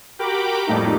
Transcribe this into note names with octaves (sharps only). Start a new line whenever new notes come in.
F#4 G4 A#4 G5 B5 D6
F2 A2 G3 A3 A#3 D#4